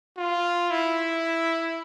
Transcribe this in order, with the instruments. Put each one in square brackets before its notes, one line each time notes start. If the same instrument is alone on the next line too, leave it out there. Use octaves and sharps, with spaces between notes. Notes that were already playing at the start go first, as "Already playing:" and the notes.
[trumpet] F4
E4